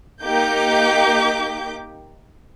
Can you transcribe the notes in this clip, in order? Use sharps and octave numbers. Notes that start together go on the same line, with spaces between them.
A#3 D#4 G4 D6 G6